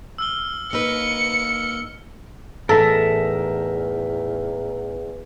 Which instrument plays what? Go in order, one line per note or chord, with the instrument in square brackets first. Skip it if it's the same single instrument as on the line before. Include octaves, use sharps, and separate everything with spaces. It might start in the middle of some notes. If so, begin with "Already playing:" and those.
[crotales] E6 F6 G7
[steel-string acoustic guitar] A#3 D#4 B4 [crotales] E6 F6 [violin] C#7
[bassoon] E2 [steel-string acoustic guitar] A2 E3 D#4 [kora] A4 [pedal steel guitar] A#4 E5 A#5